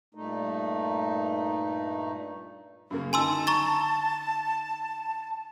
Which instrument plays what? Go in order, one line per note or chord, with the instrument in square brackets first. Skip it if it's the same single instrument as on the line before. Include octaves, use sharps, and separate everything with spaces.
[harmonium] G2 A#2 A3 D#4
[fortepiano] F#2 C#3 A#3
[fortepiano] D3 D#4 [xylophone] G#5 C6 E6 [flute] A5
[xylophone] A#5 C#6 A6